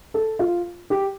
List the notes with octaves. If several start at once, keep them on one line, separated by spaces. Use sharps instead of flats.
A4
F4
G4